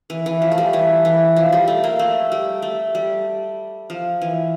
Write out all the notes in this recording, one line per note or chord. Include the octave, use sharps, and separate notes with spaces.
E3
E3
F3
A3
G3
E3
E3
F3
G3
A3
A#3
A3
G3
A3
G3
F3
E3